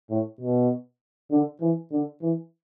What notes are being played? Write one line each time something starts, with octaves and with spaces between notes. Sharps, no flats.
A2
B2
D3
E3
D3
E3